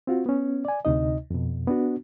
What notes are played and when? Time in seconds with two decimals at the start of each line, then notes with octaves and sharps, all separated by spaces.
0.07 C4 F4 F#4
0.26 B3 C#4
0.65 D5 G#5
0.85 D2 C3 D#4 D#5
1.31 F2 B2
1.67 B3 D4 F#4